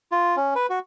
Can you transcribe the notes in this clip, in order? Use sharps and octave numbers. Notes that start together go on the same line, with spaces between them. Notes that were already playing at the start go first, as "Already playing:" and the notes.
F4
C#4
B4
F#4